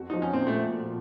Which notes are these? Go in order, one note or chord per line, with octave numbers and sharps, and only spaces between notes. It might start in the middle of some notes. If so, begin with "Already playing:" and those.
Already playing: F2 F#4
F3 D#4
C#4
A#2 C4
A3